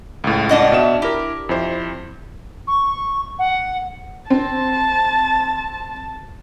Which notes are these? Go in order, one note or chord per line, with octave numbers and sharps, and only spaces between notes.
C#2 A2
D4 D#5 F#5
B2 E5 E7
E4 G4 A#4
F2 E4 C5
C#6
F#5
C4 A5